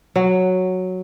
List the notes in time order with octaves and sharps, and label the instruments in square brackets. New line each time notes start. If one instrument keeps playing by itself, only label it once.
[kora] F#3